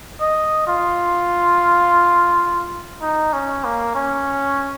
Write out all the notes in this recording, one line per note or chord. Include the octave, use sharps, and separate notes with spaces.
D#5
F4
D#4
C#4
A#3
C#4